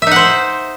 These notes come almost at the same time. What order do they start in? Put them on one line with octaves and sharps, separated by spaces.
E5 D#4 F#5 C5